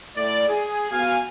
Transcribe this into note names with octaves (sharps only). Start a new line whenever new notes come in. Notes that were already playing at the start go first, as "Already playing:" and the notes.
A2 D5
G#4
B3 F#4 F5 G#5